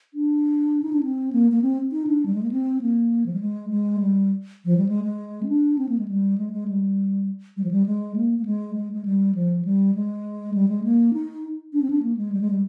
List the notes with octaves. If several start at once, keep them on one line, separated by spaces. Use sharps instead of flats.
D4
D#4
D4
C4
A#3
A#3
C4
D#4
D4
G3
G#3
A#3
C4
A#3
F3
G3
G#3
G#3
G3
F3
G3
G#3
G#3
C4
D4
C4
A#3
G#3
G3
G#3
G#3
G3
G3
F3
G3
G#3
A#3
A#3
G#3
G#3
G#3
G3
F3
G3
G#3
G3
G#3
A#3
D#4
D4
C4
D4
A#3
G#3
G3
G#3
G3